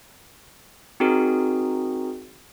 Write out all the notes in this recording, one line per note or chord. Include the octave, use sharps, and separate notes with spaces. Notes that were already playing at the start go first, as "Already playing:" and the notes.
C4 D#4 F#4 G#4 A#4